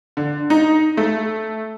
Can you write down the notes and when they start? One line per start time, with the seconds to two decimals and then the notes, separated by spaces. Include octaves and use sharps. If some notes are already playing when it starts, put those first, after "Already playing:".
0.17 D3
0.50 D#4
0.97 A3